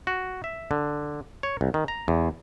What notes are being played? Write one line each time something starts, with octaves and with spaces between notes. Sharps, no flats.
F#4
E5
D3
C#5
C2
D#3
A#5
E2